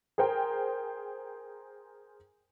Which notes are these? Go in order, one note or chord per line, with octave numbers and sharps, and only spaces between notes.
G#4 A#4 C5 G5